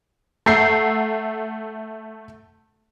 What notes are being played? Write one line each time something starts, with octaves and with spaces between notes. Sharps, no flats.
A3 E5 F#5 A#5 G6 C7